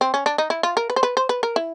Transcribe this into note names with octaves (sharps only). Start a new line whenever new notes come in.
C4
C#4
D4
D#4
E4
F4
A#4
B4
C5
B4
C5
B4
A#4
E4